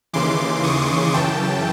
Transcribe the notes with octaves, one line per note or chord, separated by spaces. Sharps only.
D#2 C#3 E3 C6 D6
C#6 D#6
F#2 C#3 E3 G5 A5